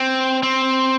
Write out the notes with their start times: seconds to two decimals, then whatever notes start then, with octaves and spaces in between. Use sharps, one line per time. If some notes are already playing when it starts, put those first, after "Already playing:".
Already playing: C4
0.43 C4